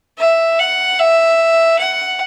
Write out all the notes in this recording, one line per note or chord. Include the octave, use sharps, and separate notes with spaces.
E5
F#5
E5
F#5